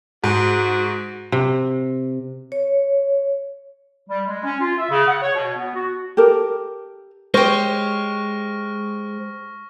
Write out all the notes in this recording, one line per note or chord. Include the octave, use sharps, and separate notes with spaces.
G#2 F#4
C3
C#5
G3
G#3
C#4
F4
E5
C#3
F#5
C#5
B2
B3
F#4
G4 A4 A#4
G#3 G4 C5 C#5 C#6 F6 A#6